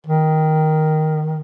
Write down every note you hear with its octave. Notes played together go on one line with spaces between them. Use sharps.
D#3